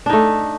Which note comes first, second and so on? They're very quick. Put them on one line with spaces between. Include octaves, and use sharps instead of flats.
D4 D#4 A3